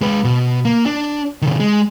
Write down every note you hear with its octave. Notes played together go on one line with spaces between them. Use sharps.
G#3 B4
B2
A#3
D4
C3 D#3
G#3